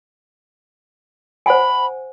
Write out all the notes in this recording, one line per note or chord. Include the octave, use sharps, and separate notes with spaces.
C5 F#5 G#5 B5